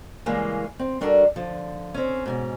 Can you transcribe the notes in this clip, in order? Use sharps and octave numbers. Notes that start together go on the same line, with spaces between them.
C#3 E3 G3 G#3 A#3
C4
G3 D4 F#4 A4 A#4
D3 F3
C4 C#4
G#2 B2 C#4